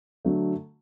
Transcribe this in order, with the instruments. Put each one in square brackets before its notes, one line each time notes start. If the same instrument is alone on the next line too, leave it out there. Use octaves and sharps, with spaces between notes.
[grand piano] D3 F#3 A3